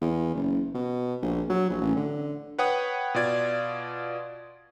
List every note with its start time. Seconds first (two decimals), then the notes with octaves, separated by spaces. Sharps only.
0.01 E2
0.35 F#1
0.74 B2
1.22 A#1
1.50 F#3
1.70 A#1
1.81 A1
1.97 D3
2.59 B4 C#5 F#5 G5 D#6
3.14 B2 F4 D5 G#6